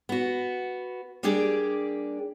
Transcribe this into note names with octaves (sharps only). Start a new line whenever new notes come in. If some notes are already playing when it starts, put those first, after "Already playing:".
B3 F#4
G3 A#3 D4 G4 G#4 D5